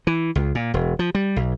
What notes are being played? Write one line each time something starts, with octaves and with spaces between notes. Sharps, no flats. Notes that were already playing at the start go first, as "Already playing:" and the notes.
E3
C#2
A#2
E1
F3
G3
B1